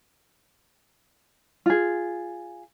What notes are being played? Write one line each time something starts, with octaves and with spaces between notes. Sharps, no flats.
F4 G#4